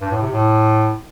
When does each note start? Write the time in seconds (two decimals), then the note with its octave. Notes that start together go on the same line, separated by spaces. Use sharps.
0.01 G2
0.11 A2
0.22 C3
0.32 A2